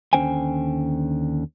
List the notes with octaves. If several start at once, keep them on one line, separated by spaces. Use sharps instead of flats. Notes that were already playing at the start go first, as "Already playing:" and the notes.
D#2 D3 C#4 C5 G5 G#5